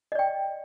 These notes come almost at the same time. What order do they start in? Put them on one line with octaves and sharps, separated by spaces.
D#5 D5 G5